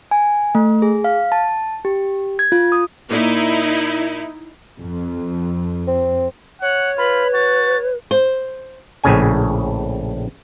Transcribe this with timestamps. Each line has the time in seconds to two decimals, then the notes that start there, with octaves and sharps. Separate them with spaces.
0.11 G#5
0.55 A3
0.82 G#4
1.04 F5
1.32 A5
1.85 G4
2.39 G#6
2.52 F4
2.72 D#6
3.10 A#2 D#4 E4
4.79 F2
5.87 C4
6.62 C#5 F#5
6.98 F4 B4 B5
7.33 F#4 A6
8.11 C5
9.04 A#1 A2 C#3 G#5